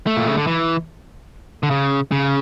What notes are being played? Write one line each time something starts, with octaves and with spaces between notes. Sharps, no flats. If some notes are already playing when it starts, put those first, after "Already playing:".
A3
A#2
C#3
D3
E3
D3
C#3
C#3